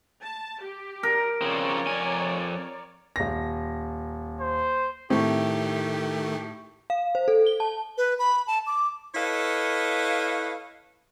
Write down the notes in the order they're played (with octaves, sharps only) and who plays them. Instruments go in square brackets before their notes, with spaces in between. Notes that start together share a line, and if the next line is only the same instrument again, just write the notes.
[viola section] A5
G4
[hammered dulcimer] A#4
[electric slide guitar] C#3 F3 C4 [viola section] C#5 D5
[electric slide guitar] F2 G#5
[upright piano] D#1 A#6
[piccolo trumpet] C5
[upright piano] A2 [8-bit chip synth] D#3 A3 [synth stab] C4 [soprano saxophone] G4
[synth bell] F5
C5
A4
G7
A5
[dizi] B4
B5
A5
D6
[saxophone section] E4 A4 B4 C#5 D#5 F5